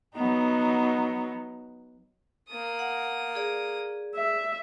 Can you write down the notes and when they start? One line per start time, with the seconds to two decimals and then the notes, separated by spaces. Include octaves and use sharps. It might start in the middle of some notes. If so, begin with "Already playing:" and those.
0.15 F#3 B3 D#4
2.50 A#3 D#6
2.79 F#5
3.35 G#4 D5
4.16 E5